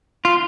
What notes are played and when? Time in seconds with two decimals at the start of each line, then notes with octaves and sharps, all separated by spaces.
0.25 F4